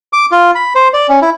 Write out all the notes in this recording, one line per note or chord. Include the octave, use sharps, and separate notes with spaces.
D6
F4
B5
C5
D5
C#4
E4